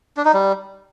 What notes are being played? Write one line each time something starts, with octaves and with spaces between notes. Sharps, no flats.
D4
D#4
G3